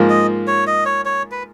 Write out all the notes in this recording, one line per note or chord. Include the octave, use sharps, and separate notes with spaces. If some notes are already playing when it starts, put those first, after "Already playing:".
Already playing: G#2 F3 A#3
D#5
C#5
D#5
C#5
C#5
B4